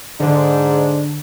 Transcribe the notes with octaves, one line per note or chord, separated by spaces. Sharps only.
G#2 D3 D4